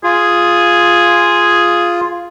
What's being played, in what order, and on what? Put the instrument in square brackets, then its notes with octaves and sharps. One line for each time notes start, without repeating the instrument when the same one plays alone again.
[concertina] F4 [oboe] G#4